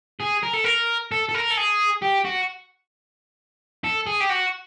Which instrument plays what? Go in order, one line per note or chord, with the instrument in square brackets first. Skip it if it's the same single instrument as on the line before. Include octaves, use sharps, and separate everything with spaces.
[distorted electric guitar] G#4
A#4
A4
A#4
A4
A4
A#4
A4
G#4
G4
F#4
A4
G#4
G4
F#4